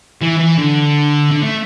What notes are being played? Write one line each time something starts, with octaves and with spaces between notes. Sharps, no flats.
E3
E3
D3
D3
A3